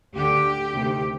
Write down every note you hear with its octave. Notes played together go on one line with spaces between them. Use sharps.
D2 D3 G4
D2 C3 D#3